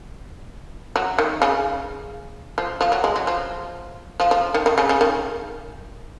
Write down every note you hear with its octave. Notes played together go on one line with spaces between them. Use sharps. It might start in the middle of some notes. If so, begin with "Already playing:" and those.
F#3
D#3
C#3
F3
F3
F#3
G#3
F#3
F3
F3
F3
D#3
D#3
C#3
C#3
D#3